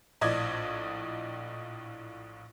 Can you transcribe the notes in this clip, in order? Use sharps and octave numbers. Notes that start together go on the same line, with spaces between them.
A#1 A2 D5 D#5 G#6